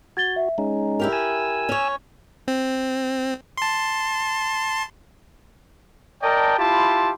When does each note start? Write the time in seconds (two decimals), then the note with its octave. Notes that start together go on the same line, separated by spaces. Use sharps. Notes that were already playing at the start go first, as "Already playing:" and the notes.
0.17 F#4 G#6 A6 G7
0.36 E5
0.58 G#3 C#4 D#4 A#5
1.00 E4 G4 A#4
1.13 G#5 E6
1.69 C#4 C#5
2.48 C4
3.58 A5 C6
6.23 A#4 D5 D#5 G5 A5
6.58 E4 F4 G4 A5 B5 C6